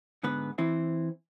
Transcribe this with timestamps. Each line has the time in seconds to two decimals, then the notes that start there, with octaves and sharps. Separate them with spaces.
0.23 G#2 D3 B3 B4
0.58 E3 C4 E4